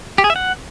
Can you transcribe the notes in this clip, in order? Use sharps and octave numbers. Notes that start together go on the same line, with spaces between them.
G4
G#4
E5
F#5